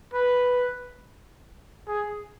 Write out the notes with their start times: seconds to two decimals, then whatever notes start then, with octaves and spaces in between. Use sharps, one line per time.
0.14 B4
1.88 G#4